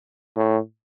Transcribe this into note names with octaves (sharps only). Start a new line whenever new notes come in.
A2